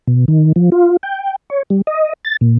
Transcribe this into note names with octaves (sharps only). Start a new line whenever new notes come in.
B2
D#3
F3
F4
G5
C#5
G3
D#5
A6
A#2